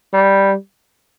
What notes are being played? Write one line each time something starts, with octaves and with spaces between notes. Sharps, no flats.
G3